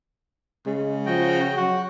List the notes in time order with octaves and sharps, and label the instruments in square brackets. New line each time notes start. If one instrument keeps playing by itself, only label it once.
[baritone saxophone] C#3 [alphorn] G#3
[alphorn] F3 [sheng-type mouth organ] F#4 D#5 G5
[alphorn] F#3 [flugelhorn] F#4 [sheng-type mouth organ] F#5